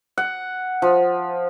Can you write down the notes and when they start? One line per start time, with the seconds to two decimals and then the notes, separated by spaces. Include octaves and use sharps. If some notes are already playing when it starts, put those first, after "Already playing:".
0.18 F#5
0.82 F3